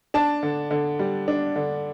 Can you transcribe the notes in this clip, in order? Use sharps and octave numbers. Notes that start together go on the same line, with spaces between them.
D4 A5
D3
D3
G3
D4
D3